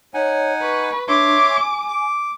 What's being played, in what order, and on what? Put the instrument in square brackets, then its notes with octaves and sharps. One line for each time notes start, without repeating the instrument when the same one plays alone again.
[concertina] D#4 F#5 G#5 [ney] C#5
[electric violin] B4 [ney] C#6
[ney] D4 [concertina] C#5 E5 C6 [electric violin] D6
[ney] G#5
[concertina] D6